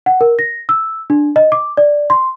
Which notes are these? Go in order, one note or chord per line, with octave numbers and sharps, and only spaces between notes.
F#5
A#4
A#6
E6
D4
D#5
D6
D5
C6